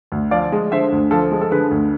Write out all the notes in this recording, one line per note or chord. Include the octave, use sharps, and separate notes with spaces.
D2
F3 D5 F5
G#3
D3 C5 E5
D2
F3 A4 C5
G#3
A4
D3 G#4 B4
D2